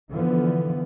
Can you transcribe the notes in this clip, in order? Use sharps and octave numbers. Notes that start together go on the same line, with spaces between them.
D3 E3 F3 B3